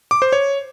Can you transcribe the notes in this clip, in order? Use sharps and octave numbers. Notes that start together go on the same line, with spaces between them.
D6
C5
C#5